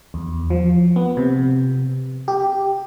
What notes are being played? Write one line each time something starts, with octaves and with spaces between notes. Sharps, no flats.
E2
F3
B3
C3
G4